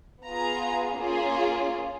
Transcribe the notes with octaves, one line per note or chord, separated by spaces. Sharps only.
B3 F4 G#4 A#5
A#3 C#4 F4 G#4